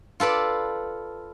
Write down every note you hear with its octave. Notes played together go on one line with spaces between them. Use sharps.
F4 A4 B4 D5